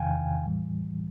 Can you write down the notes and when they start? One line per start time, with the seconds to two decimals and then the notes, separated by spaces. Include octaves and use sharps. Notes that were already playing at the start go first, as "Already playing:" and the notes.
Already playing: E2 C3 D#3 F5 G5 G#5
0.46 A2 E3 G3